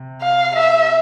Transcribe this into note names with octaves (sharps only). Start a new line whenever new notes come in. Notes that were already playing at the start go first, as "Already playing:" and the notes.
Already playing: C3
F5
E5